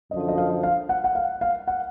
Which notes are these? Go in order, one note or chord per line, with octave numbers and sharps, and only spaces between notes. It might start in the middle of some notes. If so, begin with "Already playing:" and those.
F#2 D3 F3 D#5
D#5
F5
F5
F#5
F#5
F5
F5
F#5